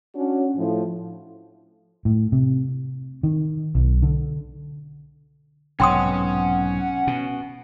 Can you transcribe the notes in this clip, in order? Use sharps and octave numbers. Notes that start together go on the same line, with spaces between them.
C#4 D4 F#4
A2 F3
A2
C3
D#3
B1
D3
B1 G#2 C3 C#4 F#5 G5 C6 D#6
B2